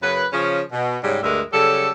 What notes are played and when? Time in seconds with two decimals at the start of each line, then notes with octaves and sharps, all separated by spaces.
0.03 F#2 C#3 B4
0.33 C#3 F3 C#4
0.72 B2
1.04 G#2 C#3 G3
1.23 D2 G2 G#3 A#4 E5
1.52 C#3 F#3 G3 A4